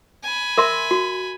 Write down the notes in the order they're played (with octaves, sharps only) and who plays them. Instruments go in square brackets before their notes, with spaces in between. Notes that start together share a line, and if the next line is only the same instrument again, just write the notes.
[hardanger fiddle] G#5 B5
[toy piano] A#4 E5 C6
F#4